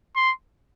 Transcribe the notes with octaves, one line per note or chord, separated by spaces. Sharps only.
C6